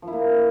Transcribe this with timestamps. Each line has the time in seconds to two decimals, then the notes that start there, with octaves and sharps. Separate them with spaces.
0.02 F3
0.07 E4
0.13 A#3